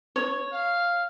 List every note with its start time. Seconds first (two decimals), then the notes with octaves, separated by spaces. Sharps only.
0.16 C#5
0.52 F5